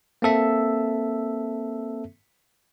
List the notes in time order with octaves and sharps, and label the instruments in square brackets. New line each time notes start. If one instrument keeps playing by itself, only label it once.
[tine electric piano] A#3 C4 A4 E5